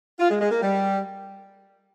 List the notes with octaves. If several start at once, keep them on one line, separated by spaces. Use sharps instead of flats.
F4
G#3
G#3
A#3
G3